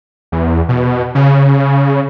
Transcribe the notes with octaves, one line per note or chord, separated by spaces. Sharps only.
E2
B2
C#3